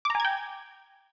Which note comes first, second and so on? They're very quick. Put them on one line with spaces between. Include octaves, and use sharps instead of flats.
D6 A#5 G#5 G#6 G5